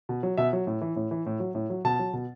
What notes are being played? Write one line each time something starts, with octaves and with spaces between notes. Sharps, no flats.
B2
F#3
B2 E5
F#3
A2
E3
A2
E3
A2
F#3
A2
F#3
B2 A5
F#3
B2